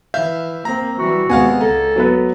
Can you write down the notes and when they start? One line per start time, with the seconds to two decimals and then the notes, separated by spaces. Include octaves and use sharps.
0.14 E3 E5 F5 G6
0.65 A#3 C4 A#5
0.98 E3 G3 F#4
1.30 D#2 C3 G#3 B3 F5 F#5 G#5
1.61 C#2 A4 A#5
1.96 F#3 B3 B4